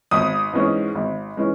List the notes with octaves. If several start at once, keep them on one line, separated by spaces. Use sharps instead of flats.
G#1 D#6
G#2 E3 G#3 C#4
G#1
E3 G#3 C#4